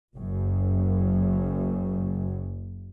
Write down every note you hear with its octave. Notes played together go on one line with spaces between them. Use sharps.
F#1 F#2